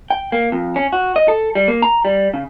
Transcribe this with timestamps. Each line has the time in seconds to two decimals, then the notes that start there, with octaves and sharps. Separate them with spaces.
0.10 G5
0.32 A#3
0.52 F2
0.76 C#4
0.93 F#4
1.16 D#5
1.28 A4
1.55 G3
1.68 A#3
1.82 A#5
2.05 G3
2.34 C#3